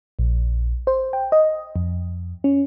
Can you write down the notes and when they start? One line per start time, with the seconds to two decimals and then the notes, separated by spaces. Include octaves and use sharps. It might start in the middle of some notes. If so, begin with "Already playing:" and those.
0.19 A#1
0.87 C5
1.13 G5
1.32 D#5
1.76 F2
2.44 C#4